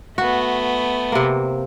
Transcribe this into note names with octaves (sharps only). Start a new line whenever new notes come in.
A3 B3 F#4
C3 A#3